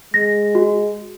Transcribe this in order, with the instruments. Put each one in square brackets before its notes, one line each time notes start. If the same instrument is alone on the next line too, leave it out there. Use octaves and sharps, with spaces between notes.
[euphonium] G#3 [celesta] A#6
[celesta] F#4